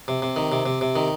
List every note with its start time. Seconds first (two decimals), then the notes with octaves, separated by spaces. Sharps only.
0.08 C3
0.22 C3
0.36 D#3
0.52 C3
0.66 C3
0.81 C3
0.96 D#3